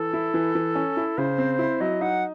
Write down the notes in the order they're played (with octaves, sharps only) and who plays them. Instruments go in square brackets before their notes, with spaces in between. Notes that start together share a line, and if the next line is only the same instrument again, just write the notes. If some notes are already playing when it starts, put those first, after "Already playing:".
Already playing: [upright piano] E3 [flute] A4
[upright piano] E4
E3
E3
C#4
E4
[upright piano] C#3 [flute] C5
[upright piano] C4
E4
[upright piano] F#3 [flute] D#5
[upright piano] D#4 [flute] F#5